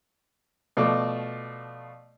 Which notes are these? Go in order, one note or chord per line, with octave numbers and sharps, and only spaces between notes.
B2 F3 A3 D5 D6